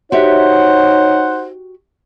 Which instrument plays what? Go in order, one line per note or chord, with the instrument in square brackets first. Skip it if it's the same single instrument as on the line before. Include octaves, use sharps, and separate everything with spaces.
[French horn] D#4 [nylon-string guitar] F#4 G4 E5 [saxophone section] C5 F#5 [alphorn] C#5